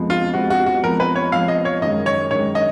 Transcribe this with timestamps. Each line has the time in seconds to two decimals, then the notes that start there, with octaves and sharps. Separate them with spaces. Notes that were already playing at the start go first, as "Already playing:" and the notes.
Already playing: F2 F3 G#3 B3
0.10 F4
0.34 F2 F3 G#3 B3 F#4
0.50 F#4
0.66 F#4
0.83 F2 F3 G#3 B3 A#4
1.00 B4
1.15 C#5
1.32 F2 F3 G#3 B3 F5
1.48 D#5
1.65 C#5
1.82 F#2 D#3 G#3 D#5
2.06 C#5
2.31 F#2 D#3 G#3 C#5
2.55 D#5